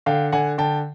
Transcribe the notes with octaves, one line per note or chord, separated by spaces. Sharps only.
D3 F5 G5
D3 F#5 G#5
D3 G5 A5